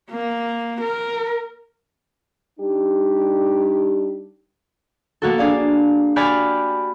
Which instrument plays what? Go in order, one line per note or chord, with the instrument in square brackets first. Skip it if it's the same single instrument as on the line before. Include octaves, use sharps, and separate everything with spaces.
[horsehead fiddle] A#3
A#4
[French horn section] G3 D4 D#4 G4
[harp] A#3 F#4 A4
D4 G#4 D5 F5
F#4 G4 D5 G#5 B5 F6